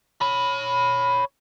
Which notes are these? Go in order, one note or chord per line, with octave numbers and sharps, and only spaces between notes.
C#5 B5